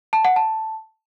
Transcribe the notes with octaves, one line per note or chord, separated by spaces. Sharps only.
A5
F#5
A5